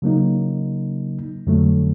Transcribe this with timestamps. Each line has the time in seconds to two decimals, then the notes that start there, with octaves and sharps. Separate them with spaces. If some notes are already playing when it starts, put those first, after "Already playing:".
0.02 C#3 F#3 A#3 D#4
1.47 F2 D3 F#3 A3